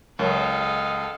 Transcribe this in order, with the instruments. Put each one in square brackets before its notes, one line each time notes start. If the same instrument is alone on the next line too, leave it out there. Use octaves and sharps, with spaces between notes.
[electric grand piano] C#2 [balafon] F#3 A#4 C#5 [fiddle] A4 [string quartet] D#5 F5 F#5